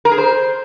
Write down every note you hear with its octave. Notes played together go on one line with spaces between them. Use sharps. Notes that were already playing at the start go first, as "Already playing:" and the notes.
A#4
G#4
C5